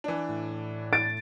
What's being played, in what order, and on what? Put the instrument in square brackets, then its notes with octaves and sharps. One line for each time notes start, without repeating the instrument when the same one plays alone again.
[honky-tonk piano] E3 D4
[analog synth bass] A2
[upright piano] A6 D7